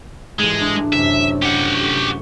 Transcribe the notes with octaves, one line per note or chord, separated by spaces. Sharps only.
A1 G#2 G#3
D4
F#2 C3 E5
G4 F#5
C#6